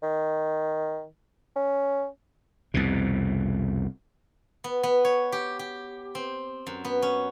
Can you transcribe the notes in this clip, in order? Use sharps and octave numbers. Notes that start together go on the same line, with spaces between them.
D#3
C#4
C2 F2 B2
B3
B3
C#5
G4
G4
C4
F#2
B3
C#4